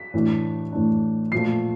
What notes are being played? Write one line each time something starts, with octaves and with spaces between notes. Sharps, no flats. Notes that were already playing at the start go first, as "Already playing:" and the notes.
Already playing: B6
A2 E3 A3 D4
A2 E3 A3 D4
A#2 F3 A3 C7